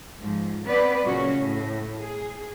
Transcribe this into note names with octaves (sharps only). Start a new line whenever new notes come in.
G#2 F3
B3 C4 B4 D5
A#2 C#3 F#3 C#4 F#4
A2
G#4